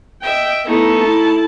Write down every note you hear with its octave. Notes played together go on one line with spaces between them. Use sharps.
D#5 E5 G5
A3 B3 D#4 E4
E4 A5